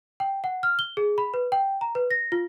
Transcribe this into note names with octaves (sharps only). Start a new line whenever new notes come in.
G5
F#5
F6
G7
G#4
B5
B4
G5
A#5
B4
A#6
F4